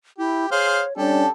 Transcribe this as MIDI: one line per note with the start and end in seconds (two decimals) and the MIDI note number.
0.18 0.46 64
0.18 0.48 67
0.51 0.83 68
0.51 0.83 72
0.51 0.93 73
0.51 0.83 77
0.97 1.24 55
0.97 1.24 61
0.97 1.24 62
0.97 1.28 67
0.97 1.28 69
0.97 1.31 81